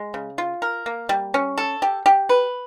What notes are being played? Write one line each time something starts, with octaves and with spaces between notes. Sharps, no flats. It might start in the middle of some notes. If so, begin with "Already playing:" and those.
Already playing: G#3
C#3
F4
A#4
A#3
G3
C#4
A4
G4
G4
B4